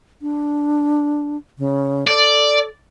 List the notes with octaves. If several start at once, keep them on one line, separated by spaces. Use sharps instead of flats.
D4
C#3
A4 D5